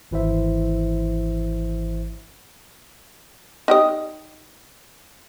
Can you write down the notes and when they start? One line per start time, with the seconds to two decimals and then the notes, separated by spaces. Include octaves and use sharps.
0.11 G#1 E3 E4 C5 E5
3.68 D#4 G4 D#5